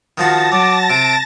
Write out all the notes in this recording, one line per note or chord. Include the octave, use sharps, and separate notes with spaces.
D#3 F3 F#4 A5 A6 A#6
F#3 D6
C3 D7